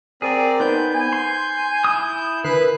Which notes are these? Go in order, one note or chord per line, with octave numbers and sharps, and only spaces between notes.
C4 G#4 A#4 D5
B3 D#4 C5 G6
G#5
C6
E4 D#6
D3 A#4 B4 B5 F#6 C7